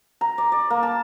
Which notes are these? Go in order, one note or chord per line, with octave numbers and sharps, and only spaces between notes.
A#5
D5
D5
A#3
A5